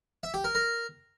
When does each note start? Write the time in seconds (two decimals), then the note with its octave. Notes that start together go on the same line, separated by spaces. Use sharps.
0.23 E5
0.34 G4
0.44 A#4
0.55 A#4